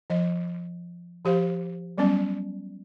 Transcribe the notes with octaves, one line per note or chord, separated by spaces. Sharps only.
F3 D#5
F3 G4 C5 F5
F#3 G3 B3 C#4 D5